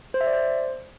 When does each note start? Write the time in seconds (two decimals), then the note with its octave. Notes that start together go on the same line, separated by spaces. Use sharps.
0.14 C5
0.21 E5
0.27 D5
0.33 C5